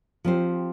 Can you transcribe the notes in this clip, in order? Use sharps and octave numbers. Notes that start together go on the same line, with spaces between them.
F3 C4 G4 C5